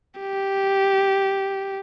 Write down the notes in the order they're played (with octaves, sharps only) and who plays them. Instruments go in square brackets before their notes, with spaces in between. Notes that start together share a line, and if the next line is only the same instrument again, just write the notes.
[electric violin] G4